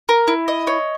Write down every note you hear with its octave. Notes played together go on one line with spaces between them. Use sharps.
A#4
E4
D#5
C#5